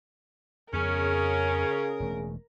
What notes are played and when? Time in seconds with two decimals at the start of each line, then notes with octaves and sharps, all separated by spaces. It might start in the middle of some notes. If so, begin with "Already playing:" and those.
0.73 F2 C#3 B3 C#4 G#4 A#4
2.00 E1 A3